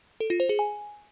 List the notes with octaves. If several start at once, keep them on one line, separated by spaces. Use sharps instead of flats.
A4
F4
C5
G#4
G#5